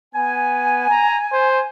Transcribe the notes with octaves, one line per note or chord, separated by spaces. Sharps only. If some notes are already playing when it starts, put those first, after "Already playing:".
B3 G#5
A#5
C5